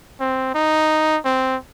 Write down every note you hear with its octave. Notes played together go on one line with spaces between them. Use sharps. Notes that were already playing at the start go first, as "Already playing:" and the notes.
C4
D#4
C4